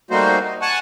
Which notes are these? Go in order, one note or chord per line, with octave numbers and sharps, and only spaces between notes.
G3 A3 A#3 D#4 F#4 C5
D#4
F#5 G#5 A5 C#6 F#6